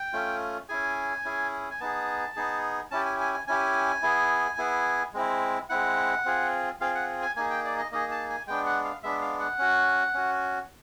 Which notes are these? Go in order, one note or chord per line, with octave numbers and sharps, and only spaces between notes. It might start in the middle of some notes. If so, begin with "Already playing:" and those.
Already playing: G5
A3 C#4 F4
C#4 E4 G#4 G#5
C#4 E4 G#4
G#5
B3 D#4 G#4 A5
B3 D#4 G#4
C#4 E4 G4 A5
G#5
G#5
G#5
C#4 E4 G4 G#5
B3 E4 G#4
B3 E4 G#4
G#3 C4 E4
G#3 C4 E4 F#5
C4 F4 G#4
C4 F4 G#4 F5
F#5
G#5
A#3 D#4 G#4 G#5
G5
D5
D#5
A#3 D#4 G#4 D#5
A5
G#5
G#3 B3 D4 G5
F#5
F5
G#3 B3 D4 E5
F5
F#5
C#4 F#4
C#4 F#4